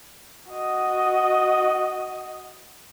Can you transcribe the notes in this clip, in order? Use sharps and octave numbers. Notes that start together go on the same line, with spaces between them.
F#4 D#5